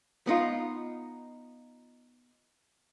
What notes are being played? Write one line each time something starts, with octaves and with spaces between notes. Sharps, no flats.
B3 D#4 F4